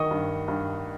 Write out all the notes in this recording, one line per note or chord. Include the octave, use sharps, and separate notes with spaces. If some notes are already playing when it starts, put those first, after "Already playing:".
Already playing: D#3 D#5 C#6 D#6
G2
G2